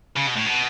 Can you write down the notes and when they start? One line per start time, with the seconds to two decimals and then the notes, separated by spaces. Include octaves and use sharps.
0.16 C#3
0.26 B2
0.36 A2
0.46 B2